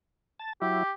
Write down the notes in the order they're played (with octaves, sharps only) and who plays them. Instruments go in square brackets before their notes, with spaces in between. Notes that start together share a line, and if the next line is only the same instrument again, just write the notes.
[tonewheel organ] A5
[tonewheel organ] F#3 E4 [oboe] G4